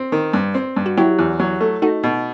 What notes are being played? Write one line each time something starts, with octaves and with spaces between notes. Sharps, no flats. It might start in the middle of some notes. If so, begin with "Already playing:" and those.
Already playing: C4
D#3
G2
C4
G2
F#4
F#3 E4 G4
E2
F#3
A3
A3 D#4 F#4
B2